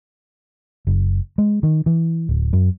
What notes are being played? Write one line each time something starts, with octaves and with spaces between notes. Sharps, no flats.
F#1
G#3
D#3
E3
D1
F#2